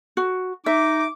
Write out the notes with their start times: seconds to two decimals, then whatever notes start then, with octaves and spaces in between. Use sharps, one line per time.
0.17 F#4
0.66 D#4 E5 D6